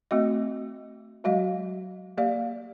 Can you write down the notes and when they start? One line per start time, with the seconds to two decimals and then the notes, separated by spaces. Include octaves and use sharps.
0.11 A3 C4 F#4 D#5
1.24 F#3 G#3 F#4 D#5 F5
2.18 A#3 G4 D5 F5